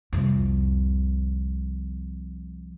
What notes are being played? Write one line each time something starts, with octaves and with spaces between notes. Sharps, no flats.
C2 F2